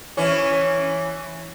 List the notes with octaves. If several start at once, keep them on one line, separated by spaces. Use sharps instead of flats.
E3 C#4